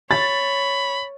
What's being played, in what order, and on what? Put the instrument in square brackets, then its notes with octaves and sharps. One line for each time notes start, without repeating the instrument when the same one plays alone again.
[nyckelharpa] C#5 [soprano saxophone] B5 [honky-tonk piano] A6